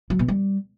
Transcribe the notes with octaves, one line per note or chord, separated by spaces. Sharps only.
F#3
B2
G3